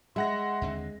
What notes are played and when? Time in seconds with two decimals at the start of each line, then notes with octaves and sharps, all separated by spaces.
0.16 G#3 E5 F#5 C6 A#6
0.62 D#2 D3 C4